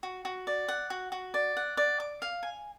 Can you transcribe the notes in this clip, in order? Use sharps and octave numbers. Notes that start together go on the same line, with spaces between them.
F#4
F#4
D5
F#5
F#4
F#4
D5
F#5
D5
D6
F5
G#5